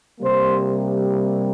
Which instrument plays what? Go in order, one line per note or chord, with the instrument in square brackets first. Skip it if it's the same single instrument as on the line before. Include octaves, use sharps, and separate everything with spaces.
[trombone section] C3 G3 A#3 C5